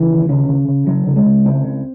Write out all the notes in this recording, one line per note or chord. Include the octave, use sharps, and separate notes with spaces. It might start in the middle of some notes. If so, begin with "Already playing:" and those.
Already playing: C#3 E3
D#2
C#3 C#4
C#3
C#3
C#3 F#3
C#3
G#3
C#3
C#2 C4
C#3